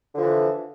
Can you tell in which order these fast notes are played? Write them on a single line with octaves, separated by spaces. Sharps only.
D3 F3 E3